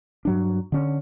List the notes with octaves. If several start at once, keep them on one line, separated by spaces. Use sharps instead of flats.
G2 F#3 D4
D3 C#4